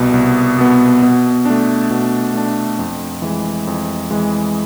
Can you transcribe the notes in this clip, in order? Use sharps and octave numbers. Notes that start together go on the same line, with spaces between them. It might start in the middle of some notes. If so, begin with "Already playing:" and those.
Already playing: C2 B2 B3
C2
B2 B3
B2
A3 D4
B2
A3 D4
F2
E3 G#3
F2
E3 G#3